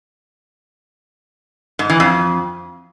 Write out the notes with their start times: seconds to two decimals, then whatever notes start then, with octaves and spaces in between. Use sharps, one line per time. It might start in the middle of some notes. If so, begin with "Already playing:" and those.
1.79 G#2
1.90 E3
2.00 F2